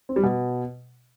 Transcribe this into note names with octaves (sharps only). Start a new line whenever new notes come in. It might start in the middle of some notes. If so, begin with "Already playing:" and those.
C4
G3
B2